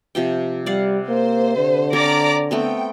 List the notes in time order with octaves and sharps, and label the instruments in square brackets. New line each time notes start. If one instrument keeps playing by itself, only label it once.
[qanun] C3 F3 G5
[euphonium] G3 [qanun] D5 F5 F#5
[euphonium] A#3 [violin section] C5
[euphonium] D3
[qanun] C4 A#4 C#5 [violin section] D5 A#5 D6
[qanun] A3 B3 C4 [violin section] G5